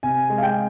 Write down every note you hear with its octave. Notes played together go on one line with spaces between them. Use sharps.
C3 G#5
G#3
F5
G5